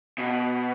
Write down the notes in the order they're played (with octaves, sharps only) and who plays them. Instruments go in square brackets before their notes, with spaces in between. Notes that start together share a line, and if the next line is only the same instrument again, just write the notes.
[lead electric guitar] B2